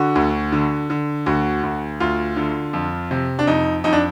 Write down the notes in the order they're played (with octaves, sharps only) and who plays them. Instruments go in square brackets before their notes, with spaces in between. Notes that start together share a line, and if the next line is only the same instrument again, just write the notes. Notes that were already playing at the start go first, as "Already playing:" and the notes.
Already playing: [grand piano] D3 F#4
D2
D3
D3
D2 F#4
D2
D2 F4
D3
F2
C3
D4
F2 D#4
F2 D#4
D4